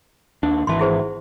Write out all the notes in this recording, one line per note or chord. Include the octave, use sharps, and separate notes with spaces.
D#2 D4
G#1 E3 A5 C6
E4 G#4 C5